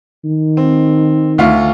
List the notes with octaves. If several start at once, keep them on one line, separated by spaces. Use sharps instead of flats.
D#3
C4
D2 F4 F5